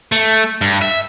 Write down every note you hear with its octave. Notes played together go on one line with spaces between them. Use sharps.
A3
G2
E5